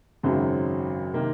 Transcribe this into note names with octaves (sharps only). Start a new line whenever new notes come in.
G#1 F#2 C#3 F#3 C4
C3 D#3 A#3